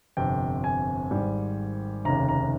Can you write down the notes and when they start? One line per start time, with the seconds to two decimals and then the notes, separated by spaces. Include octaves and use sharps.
0.17 G1 F2 C3 G5
0.64 G#5
1.11 G#1 G#2 G3
2.05 F1 D#2 C#3 A#5
2.29 A#5